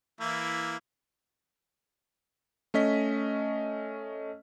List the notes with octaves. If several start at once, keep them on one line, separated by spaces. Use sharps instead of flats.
E3 A#3 E4
A3 C#4 D#5 B6